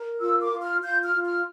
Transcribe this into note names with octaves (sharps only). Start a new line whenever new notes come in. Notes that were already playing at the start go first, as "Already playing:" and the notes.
Already playing: A#4
F4 E6
D6
F4
F6
F4 G6
F6
F4
F6